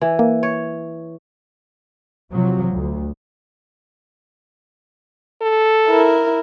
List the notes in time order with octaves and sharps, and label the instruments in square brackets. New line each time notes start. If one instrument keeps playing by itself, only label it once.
[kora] E3
[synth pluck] A#3
[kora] C#5
[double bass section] C3 F3 F#3
D2
[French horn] A4
[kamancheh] E4 A#4